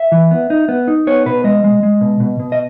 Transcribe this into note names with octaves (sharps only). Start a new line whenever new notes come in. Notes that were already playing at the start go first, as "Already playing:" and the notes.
Already playing: E5
E3
B3
D#4
B3
D#4
B3 C#5
B2 B4
G#3 D#5
G#3
G#3
B2
B2
B2
D#5